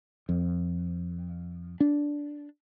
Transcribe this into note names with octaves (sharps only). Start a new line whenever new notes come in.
F2
D4